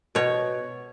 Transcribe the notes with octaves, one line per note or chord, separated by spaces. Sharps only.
B2 C#5